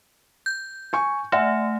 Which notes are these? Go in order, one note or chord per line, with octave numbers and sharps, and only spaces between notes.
G6
G#5 C#6
A3 E5 F#5 G#5